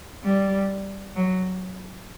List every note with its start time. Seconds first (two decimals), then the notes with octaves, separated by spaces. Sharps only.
0.24 G3
1.16 F#3